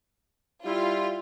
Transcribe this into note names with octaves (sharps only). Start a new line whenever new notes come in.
G3 E4 F4